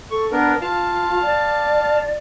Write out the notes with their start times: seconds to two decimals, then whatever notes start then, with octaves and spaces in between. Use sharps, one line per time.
0.11 A4 C#6
0.32 B3 D4 A#4 B4
0.61 F4 F5 A5
1.22 D5